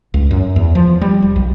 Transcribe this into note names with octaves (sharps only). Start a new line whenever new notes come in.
C#2
F#2
E2
F3
G3
E1
B1